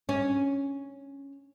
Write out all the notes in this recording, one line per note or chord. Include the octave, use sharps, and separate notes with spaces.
C#4